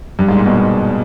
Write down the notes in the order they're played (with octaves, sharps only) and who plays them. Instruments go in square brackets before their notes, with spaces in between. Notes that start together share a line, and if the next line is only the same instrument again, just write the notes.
[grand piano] G2
G#2
A#2
B2